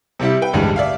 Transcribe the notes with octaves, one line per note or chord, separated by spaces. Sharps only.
C3 G3 E4 G4
B4 G5
A1 D2 G2 G3 G#3
D5 E5 F5